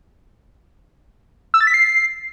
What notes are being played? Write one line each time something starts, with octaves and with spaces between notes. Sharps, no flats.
E6
A6
B6
C7